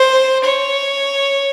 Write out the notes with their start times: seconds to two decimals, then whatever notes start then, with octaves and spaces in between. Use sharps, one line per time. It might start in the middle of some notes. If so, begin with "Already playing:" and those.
Already playing: C5
0.43 C#5